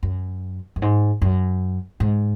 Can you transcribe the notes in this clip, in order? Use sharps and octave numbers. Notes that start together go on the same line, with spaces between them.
F#2
F#2
G#2
F#2
G#2